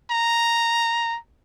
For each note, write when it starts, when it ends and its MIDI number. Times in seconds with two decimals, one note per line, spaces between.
0.11 1.18 82